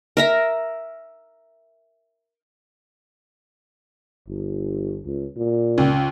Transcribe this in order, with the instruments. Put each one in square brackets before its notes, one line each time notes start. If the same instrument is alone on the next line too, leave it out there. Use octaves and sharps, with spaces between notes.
[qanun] A#4 E5 A#5
[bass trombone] G1
C#2
A#2
[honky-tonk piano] C#2